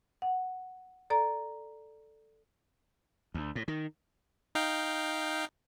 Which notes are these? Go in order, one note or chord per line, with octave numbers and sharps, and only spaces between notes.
F#5
A4 D5 A#5
D2
A2
D#3
D#4 F5 G5